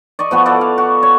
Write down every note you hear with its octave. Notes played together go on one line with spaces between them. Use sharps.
D5 D#5 C#6
F3 B3 F#4
E4 F#4 A4 D5
F5
F#4
C#5